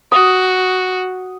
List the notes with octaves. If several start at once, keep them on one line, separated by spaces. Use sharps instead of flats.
F#4 D#6